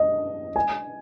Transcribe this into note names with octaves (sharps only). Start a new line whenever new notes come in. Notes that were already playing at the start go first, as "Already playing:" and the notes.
Already playing: D#5
G#5